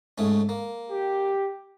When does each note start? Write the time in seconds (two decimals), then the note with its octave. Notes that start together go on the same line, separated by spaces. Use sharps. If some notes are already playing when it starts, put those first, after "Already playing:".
0.18 G#2 A3 C#4
0.49 A#3
0.90 G4